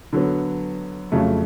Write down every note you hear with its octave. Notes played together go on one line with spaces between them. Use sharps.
D3 F#3 B3
F2 C#3 F#3 A3